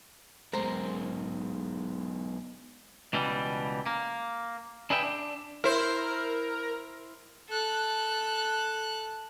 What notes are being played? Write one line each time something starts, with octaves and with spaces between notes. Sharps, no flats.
B1 G#3 A#4 C5 A#5
C#2 B2 E3 G3
A#3
D4 G#4 B4 E5 G5
D4
E4 A#4 C5
A4 F#6